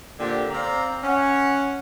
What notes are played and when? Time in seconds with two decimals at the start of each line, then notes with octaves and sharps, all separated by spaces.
0.20 A#2 D3 C4 G4
0.51 C4 D5 F5 A#5
1.03 C#4 F#5